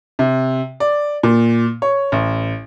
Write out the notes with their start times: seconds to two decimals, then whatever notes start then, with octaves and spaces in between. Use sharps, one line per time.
0.19 C3
0.80 D5
1.23 A#2
1.82 C#5
2.12 A1